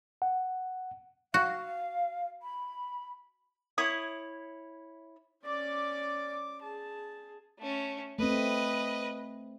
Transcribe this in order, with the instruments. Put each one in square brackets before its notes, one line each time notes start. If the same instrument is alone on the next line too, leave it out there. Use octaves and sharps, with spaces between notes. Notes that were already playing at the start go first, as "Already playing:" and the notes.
[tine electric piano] F#5
[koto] F#4 [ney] F5
[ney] B5
[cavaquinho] E4 C#5 D#6
[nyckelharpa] C#4 D5 [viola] D6
[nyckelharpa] G#4 [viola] A5
[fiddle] A3 C#4
[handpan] A3 C4 [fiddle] B4 D#5